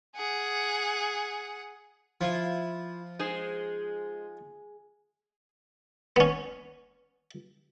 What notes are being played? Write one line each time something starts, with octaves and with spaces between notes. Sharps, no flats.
G#4 F#5
F3 E4 F4 E5
G#3 D#4 G#4 C5
B3 C#4